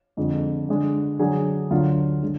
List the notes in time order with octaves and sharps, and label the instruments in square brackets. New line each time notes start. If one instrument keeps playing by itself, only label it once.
[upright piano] F2 D3 G#3
D3 G#3 D4
D3 F#3 D4 G#4
D2 D3 F#3 D4 F4
D3 G#3